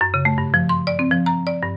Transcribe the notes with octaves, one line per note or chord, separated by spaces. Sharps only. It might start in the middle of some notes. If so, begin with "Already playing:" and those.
F#2
C#3
A3
G2
F3
C6
D5
C4
F3
A#5
D5
G2